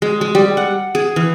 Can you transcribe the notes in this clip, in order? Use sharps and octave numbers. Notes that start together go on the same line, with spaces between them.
G#3
G#3
G3
F#5
G#4
E3